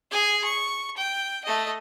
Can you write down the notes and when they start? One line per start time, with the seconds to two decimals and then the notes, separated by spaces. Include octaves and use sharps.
0.11 G#4 G#5
0.44 C#6
0.97 G5
1.45 A3 D#5